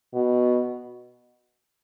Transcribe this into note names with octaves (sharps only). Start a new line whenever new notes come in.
B2